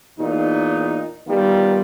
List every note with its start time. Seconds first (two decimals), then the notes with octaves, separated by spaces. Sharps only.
0.19 E2 A#2 D#4
1.28 D#3 G3 B3 F4